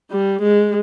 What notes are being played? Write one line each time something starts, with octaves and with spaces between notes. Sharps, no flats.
G3
G#3